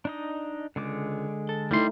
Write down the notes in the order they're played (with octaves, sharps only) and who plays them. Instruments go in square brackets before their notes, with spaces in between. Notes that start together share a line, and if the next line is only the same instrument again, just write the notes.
[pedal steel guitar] D4 D#4 D#5
[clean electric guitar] C#2 [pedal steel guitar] D3 G#3 D6
[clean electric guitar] A4
[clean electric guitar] G3 C6 [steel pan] A3 D#4 E4